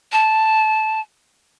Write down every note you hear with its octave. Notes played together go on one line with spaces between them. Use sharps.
A5